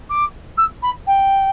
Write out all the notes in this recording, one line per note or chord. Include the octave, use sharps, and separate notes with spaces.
D6
E6
B5
G5